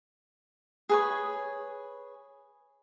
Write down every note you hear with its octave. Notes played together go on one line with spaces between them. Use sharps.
G#4 B4 C#5